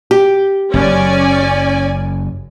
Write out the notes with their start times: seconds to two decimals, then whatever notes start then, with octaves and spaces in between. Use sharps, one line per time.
0.11 G4
0.74 F#1 F#2 C#4 D5 G#5